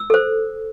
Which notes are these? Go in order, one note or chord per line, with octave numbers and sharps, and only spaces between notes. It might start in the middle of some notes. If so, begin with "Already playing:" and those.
Already playing: E6
A4 C5